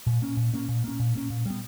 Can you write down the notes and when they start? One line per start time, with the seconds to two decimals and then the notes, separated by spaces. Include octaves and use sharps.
0.07 A#2
0.22 A#3 C#4
0.37 A#2
0.54 A#3 C#4
0.69 A#2
0.84 A#3 C#4
1.00 A#2
1.15 A#3 C#4
1.30 A#2
1.46 G3 B3